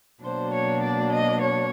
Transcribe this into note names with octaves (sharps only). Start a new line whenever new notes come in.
B2 F#3 A#3 D4 C5
C#5
D5
D#5
C#5